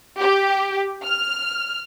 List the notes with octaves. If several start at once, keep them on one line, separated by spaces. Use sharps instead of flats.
G4
F6